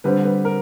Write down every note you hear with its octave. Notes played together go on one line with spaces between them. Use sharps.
D3 G3 C4 B4
B4
A#4